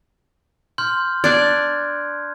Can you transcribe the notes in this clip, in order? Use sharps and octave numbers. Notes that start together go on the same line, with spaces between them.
C6 F6 G6
D4 D5 F#6 G#6